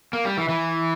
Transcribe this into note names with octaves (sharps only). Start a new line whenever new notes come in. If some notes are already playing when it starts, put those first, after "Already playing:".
A#3
G3
E3
E3